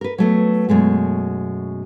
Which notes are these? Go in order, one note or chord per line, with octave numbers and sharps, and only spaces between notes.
A#4 B4
F#3 A3 B3
F#2 B2 G#3 A3